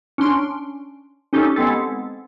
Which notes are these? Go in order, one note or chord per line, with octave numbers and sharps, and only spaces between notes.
C#4 D4 C6 D7
C#4 D#4 G4 A4
G#3 B3 C4 A4